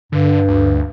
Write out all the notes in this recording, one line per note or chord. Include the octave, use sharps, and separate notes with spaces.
G2 D3
D2